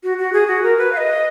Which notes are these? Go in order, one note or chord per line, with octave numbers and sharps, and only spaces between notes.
F#4
F#4
G#4
F#4
A#4
B4
F5
D#5